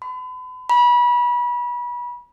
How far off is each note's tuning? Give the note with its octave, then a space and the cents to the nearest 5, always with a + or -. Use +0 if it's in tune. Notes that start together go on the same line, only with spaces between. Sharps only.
B5 +40
B5 -30